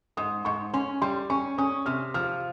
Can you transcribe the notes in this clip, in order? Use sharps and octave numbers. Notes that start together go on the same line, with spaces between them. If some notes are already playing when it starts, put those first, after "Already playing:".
G#2 D#6
G#2 C#6
C#4 C6
G3 C6
C#4 C#6
C#4 D#6
C3 F6
F3 F6